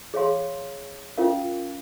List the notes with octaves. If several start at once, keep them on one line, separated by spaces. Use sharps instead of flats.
G#4 C#5 F5 C6
C#4 F4 A#4 F5